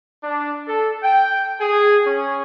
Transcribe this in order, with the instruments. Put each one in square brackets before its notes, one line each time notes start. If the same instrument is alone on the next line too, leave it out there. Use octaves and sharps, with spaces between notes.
[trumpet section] D4
A4
G5
G#4
C#4